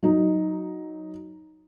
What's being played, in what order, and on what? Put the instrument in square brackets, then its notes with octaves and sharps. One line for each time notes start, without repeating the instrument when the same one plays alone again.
[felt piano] F#3 D#4